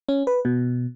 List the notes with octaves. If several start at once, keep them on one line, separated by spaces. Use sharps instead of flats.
C#4
B4
B2